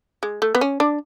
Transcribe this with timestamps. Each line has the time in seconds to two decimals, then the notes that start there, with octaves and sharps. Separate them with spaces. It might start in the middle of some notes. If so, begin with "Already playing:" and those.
0.23 G#3
0.42 A3
0.55 B3
0.61 C#4
0.80 D4